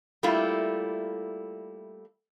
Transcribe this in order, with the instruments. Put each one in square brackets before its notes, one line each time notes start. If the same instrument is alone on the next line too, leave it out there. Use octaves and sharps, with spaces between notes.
[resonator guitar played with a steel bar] G3 A3 A#3 E4 F4